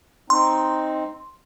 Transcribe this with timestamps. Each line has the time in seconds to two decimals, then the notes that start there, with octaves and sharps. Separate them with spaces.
0.30 C4 D#4 C6